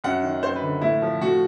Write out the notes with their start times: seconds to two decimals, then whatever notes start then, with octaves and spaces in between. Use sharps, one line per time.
0.04 F#2 F#5
0.23 D#3
0.43 F#2 C5
0.56 B4
0.62 D3
0.81 A2 E4
1.02 F3
1.21 A2 F#4